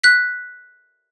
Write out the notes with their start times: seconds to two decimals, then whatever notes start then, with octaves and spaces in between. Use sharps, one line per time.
0.04 F#6 B6